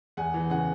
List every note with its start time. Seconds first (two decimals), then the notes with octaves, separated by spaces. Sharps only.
0.17 E2 F#5 G#5
0.34 E3
0.50 C#3 F#5 G#5